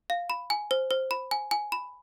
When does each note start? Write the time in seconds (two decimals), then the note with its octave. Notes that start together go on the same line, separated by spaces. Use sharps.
0.10 F5
0.30 B5
0.50 G#5
0.71 C5
0.91 C5
1.11 B5
1.31 G#5
1.51 G#5
1.72 B5